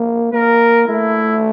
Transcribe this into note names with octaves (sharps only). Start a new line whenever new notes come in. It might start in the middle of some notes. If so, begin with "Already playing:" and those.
Already playing: A#3
A#3 A#4
A3 E4